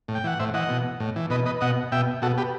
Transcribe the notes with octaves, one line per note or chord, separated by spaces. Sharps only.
A2
G5
E3 F#5
A2 C5 E5
E3 D#5 F#5
B2
A2
E3
B2 B4 D#5
B4 D#5
B2 D#5 F#5
B2 E5 G5
B2 F#4 A4
G4 B4